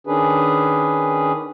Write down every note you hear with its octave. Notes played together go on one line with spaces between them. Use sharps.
D#3 C#4 D4 G#4 B4